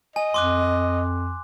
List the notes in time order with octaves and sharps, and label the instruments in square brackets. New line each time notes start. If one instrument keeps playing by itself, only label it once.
[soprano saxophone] D#5 [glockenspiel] G#5
[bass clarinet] F2 [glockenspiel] C6 D6 F#6